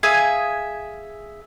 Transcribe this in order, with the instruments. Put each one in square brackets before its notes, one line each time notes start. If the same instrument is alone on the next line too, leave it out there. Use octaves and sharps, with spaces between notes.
[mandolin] G#4 E5 F5 G#5